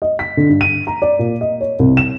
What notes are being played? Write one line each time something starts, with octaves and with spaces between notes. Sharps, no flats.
D#5
B6
D3
G2
D#7
A#5
D5
A#2
D#5
C#5
C2
E7